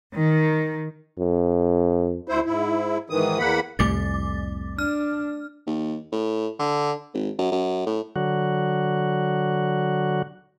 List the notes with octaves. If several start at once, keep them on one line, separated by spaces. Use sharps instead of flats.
D#3
F2
D2 E4 C5
G#2 E4
G#2 D#3 E3 D#6
E2 A#3 F#5 B5
C2 F2 A2 A3 D6 A6
D4 F6
D#2
A2
D3
G#1
F#2
F#2
A2
D3 F#3 F#4